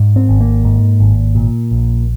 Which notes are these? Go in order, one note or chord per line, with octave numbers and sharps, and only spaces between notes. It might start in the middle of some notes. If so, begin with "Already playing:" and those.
Already playing: G#2
C4
G#1
A#3
G#2
G#1
A#2
A#1